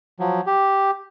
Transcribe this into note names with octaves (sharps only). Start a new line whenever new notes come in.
F3 F#3
G4